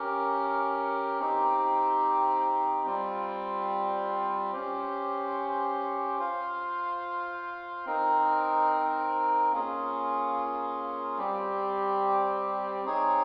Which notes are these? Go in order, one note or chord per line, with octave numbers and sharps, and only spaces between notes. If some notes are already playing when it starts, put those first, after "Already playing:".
Already playing: C#4 G4 A#4
C4 D#4 G4
G3 C4 F4
C#4 G4 C5
F4 C5 F5
C4 D#4 A#4
A#3 C#4 F4 G#4
G3 C4 G4
C4 D#4 G#4 C#5